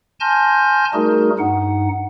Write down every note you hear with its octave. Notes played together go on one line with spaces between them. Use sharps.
G#5 A5 C6 F6 G6 A#6
G3 A3 D#4 F#4 G#4 A#4
G2 D#4 F#5